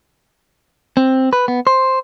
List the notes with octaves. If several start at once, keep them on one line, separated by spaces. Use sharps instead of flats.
C4
B4
B3
C5